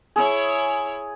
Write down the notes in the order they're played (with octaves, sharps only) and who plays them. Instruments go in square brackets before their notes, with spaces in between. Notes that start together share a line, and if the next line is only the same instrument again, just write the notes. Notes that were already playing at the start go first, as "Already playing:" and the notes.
[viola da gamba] E4 C#5 [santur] G#4